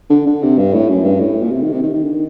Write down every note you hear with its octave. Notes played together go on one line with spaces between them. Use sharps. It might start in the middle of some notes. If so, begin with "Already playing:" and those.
D3
D3
C3
G2
A2
F#2
G2
A2
A#2
C3
D#3
C3
D#3
D#3
D3
D#3